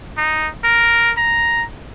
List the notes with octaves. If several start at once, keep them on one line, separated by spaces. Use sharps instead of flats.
D#4
A#4
A#5